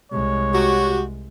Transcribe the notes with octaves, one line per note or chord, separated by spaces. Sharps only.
C2 G#3 C#5
F#4 G4